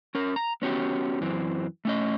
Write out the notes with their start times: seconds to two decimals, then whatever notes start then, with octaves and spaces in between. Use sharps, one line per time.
0.15 C#4 A#4
0.36 A#5
0.62 B3 C#4 F#4 G4
1.21 F#2 E3 C4
1.85 A3 C#4 D#5